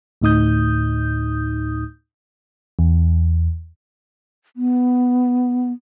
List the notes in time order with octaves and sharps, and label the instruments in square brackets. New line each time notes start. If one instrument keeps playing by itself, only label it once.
[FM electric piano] D2 A2 D#4 D#6 G6
E2
[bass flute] B3